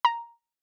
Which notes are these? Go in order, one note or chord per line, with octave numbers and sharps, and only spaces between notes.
A#5